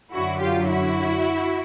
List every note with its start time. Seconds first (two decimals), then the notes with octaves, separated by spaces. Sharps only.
0.13 F#2 D3 F#3 E4 F#4
0.41 F4 G4
0.70 E4 F#4